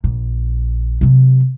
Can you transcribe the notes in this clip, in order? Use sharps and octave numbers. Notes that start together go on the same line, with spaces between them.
A#1
C3 F#3